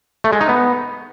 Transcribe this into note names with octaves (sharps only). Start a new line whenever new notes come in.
A3
G#3
D#4
B3